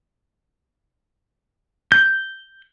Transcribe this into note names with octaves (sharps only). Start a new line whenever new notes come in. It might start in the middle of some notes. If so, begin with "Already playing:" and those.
G6